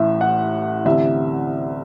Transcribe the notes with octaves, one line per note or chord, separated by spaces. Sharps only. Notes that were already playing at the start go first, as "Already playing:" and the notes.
Already playing: A1 A2 E3 E5
F#5
D2 C3 E3 E5